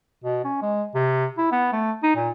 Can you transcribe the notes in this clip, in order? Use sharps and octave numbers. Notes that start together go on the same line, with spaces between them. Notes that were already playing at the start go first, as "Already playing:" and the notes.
B2
C#4
G#3
C3
E4
B3
A3
D#4
A#2